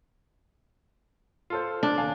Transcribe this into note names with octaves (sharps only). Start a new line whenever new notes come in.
F4 A4 C5
D4
D#1 F5 G#5